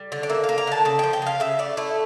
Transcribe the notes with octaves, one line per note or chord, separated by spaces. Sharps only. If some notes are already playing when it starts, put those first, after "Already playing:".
Already playing: G3
D3
D5
A#3 E5
F5
A#3
A#5
D3 A5
C#3 A5
F3 G5
G5
C#3 F5
C#3 E5
A3 D5
A3 E4